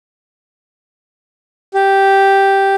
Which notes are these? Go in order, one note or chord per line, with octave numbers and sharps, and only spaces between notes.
G4